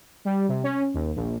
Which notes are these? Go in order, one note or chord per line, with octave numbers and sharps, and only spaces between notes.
G3
C3
C#4
D#2
A#1